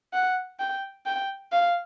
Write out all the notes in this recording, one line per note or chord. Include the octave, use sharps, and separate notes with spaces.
F#5
G5
G5
F5